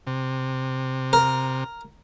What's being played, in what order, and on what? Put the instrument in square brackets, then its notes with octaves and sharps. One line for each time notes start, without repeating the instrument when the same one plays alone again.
[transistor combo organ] C3
[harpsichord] A#4